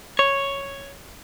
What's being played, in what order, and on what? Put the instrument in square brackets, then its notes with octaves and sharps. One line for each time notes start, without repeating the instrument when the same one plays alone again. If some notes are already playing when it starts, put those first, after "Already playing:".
[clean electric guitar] C#5